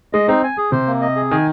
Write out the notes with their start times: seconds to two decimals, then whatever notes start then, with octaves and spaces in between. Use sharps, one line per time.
0.13 G#3 D#5
0.28 C4 D#4
0.43 G#5
0.57 G#4
0.72 C3 C5
0.87 A#3
1.01 D#5
1.16 G#4
1.31 D#3 G#5